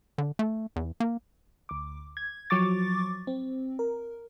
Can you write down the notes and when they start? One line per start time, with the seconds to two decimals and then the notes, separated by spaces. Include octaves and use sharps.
0.18 D3
0.39 A3
0.76 E2
1.00 A#3
1.69 D2 D6
2.17 G#6
2.50 F3 F#3 C#6 D6 A6
3.27 C4
3.79 A#4